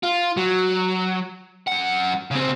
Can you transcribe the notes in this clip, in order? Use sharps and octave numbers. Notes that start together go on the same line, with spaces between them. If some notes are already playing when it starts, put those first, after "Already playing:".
F4
F#3
F#2 F#5
C#3 C4